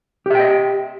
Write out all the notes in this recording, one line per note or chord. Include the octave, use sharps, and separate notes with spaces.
G4 D#5 E5 G5